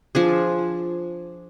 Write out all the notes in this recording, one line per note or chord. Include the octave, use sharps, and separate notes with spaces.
F3 D4 G#4